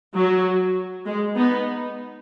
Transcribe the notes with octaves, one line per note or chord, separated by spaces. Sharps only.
F#3
G#3
B3 D#4